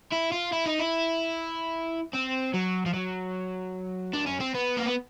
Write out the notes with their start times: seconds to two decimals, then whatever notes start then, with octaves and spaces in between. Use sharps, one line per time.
0.12 E4
0.32 F4
0.52 E4
0.66 D#4
0.79 E4
2.13 C4
2.54 F#3
2.86 F3
2.94 F#3
4.14 D4
4.27 C#4
4.41 C4
4.55 B3
4.77 A#3
4.86 B3